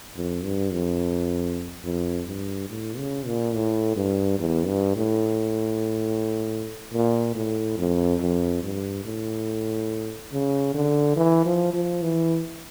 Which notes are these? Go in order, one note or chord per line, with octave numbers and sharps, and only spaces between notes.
F2
G2
F2
F2
G2
A2
C#3
A#2
A2
G2
E2
G2
A2
A#2
A2
F2
F2
G2
A2
C#3
D3
E3
F3
F3
E3